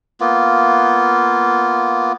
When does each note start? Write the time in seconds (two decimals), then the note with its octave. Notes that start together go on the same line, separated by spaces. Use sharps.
0.20 A#3 B3 F4